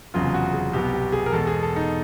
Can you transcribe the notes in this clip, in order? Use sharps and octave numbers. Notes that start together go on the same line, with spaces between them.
F1 E2 C#3 F#3 F4
F#4
G#4
C2 B2 F#3 B3 G4
G4
G#4
A#4
E2 B2 G#3 A4
G#4
A4
D#4